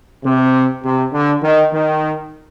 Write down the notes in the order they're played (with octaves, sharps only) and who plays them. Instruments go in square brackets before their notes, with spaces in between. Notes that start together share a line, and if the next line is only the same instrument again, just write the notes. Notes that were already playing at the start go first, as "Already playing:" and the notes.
[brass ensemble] C3
C3
D3
D#3
D#3